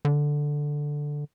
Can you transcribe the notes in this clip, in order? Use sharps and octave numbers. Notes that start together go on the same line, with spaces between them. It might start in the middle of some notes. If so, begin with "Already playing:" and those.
D3